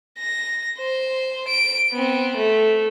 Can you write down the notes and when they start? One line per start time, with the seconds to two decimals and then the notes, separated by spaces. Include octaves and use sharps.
0.19 A#6
0.79 C5
1.48 D7
1.92 B3 C4
2.37 A3